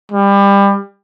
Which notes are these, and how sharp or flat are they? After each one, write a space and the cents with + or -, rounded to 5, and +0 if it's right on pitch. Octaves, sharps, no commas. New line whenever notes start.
G3 +25